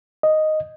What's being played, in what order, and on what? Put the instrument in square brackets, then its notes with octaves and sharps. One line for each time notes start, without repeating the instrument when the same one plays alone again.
[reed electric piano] D#5